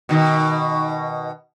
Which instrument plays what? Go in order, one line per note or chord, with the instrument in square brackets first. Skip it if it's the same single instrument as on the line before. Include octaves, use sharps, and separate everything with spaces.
[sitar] B2 D#3